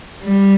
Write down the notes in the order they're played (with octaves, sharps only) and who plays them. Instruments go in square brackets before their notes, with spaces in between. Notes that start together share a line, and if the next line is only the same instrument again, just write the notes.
[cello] G3